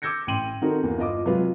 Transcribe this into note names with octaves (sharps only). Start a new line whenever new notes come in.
D6 E6 G6 G#6 A#6 C#7
A1 G5 C6 D#7 F#7
D#3 C4 D#4 F#4 A4 A#4
E2 A#3 E4
G1 F4 D#5 D6
C3 F#3 G#3 F4 B4